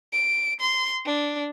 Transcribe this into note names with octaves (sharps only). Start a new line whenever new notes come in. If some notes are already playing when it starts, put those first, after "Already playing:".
D7
C6
D4